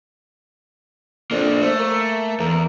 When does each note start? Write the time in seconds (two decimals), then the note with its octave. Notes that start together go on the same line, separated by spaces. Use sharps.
1.31 F2 A#3 D4
1.61 A3 C5
1.79 A#3
2.40 E2 A#4